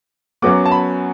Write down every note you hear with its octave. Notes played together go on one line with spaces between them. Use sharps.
F#2 F#3 B3 D6
A5
B5